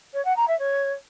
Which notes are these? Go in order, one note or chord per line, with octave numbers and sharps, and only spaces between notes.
C#5
F#5
A#5
E5
C#5